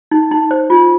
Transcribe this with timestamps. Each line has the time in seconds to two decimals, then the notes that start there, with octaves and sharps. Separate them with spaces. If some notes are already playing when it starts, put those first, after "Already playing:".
0.11 D#4
0.31 D#4
0.51 C5
0.70 F4